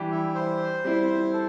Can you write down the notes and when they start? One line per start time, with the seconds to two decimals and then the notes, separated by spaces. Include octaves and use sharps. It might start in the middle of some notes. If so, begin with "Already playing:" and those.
Already playing: E3 G3 D4 G4
0.11 E4
0.35 C5
0.85 G3 C4 E4
1.33 A4